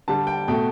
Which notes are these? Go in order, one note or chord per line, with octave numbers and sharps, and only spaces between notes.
D3 G3 A5
G5
B2 A3 G5